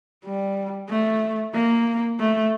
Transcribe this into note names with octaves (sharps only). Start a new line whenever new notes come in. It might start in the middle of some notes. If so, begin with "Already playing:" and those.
G3
A3
A#3
A3